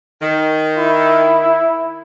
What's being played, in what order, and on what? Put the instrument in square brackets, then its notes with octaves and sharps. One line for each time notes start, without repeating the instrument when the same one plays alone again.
[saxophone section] D#3
[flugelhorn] E4